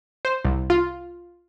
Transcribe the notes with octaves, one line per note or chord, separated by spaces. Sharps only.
C5
C2
F4